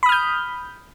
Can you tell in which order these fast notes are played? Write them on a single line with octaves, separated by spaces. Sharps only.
B5 D#6 F6 G6